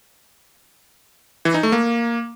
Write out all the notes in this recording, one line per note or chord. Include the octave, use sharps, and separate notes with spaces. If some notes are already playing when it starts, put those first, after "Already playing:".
E3
D#4
A3
A#3